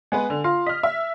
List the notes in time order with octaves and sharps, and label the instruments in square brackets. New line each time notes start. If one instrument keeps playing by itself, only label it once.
[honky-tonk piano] G#3 B3 B4 [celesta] G#5
[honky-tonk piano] D3
[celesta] F4 C6 [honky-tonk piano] F5
[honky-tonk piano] D#5 F6 [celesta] B6
[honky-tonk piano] E5